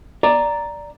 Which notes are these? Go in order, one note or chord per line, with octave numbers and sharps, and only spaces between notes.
D5 A#5